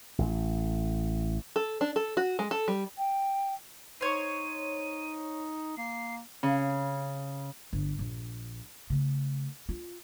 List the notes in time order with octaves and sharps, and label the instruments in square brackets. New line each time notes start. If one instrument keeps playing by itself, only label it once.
[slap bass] A1
[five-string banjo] A4
D4
A4
F#4
G#3
A4
G3
[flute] G5
[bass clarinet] D#4 [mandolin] C5 C#5 [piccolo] D#7
[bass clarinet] A#3 [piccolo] C7
[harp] C#3
[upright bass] G1
A#1
C#3 A3
F4